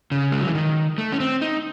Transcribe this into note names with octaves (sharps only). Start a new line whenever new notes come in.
C#3
G#3
F#3
E3
D#3
A3
C#4
C4
D#4